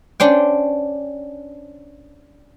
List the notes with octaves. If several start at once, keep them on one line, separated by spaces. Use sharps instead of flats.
C#4 D4 C5 G5